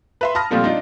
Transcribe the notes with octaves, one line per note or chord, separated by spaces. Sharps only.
B4 E5 C6
A5 B5 D#6 F6 A#6
A#2 F3 G3 A3 C4 F4
D4 D#4 F4